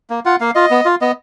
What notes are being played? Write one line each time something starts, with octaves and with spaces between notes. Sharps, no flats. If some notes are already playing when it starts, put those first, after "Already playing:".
A#3
F4 F#5
A#3 F5
F4 D#5
B3
F4
B3 D#5